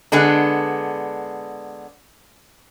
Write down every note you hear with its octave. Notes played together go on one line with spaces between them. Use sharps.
D3 G#3 B3 D4